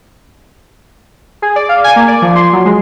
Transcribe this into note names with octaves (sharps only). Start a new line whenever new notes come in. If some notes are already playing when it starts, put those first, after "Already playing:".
G#4
D5
F5
G#5
A#3
D5
F3
C6
F#3
G#3